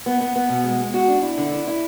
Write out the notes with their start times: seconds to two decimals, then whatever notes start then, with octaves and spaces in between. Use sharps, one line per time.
0.06 B3
0.21 B3
0.36 B3
0.49 B2
0.64 G#3
0.79 G#3
0.94 F#4
1.08 D4
1.23 E4
1.38 D3
1.52 E4
1.67 E4